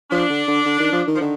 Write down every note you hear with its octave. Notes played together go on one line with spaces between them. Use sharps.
F3 D4
D3
D3
D3
D#3
F3
D#3
F3
D3 D#3